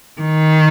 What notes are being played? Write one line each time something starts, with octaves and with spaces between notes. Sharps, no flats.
D#3